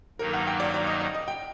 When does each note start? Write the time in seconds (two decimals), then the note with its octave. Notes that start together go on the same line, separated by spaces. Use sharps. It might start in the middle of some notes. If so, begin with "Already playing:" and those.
0.19 G2 D#3 F#3 A#3 D#4 A#4
0.33 F#5
0.47 G5
0.60 D5
0.74 D5
0.87 D#5
1.01 D#5
1.14 D#5
1.28 G5